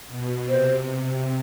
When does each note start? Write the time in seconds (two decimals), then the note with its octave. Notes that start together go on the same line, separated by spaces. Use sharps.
0.08 B2
0.49 C3 C5